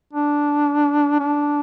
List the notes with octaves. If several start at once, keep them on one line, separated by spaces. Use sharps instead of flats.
D4
D4